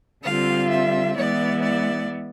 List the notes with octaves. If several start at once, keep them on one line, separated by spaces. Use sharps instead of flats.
D3 G3 C4 F4 F5
E5
E3 G#3 B3 E4 D5
D5